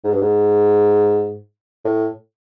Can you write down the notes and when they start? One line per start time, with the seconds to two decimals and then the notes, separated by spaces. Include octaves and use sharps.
0.04 G#2
0.12 G2
0.21 G#2
1.85 A2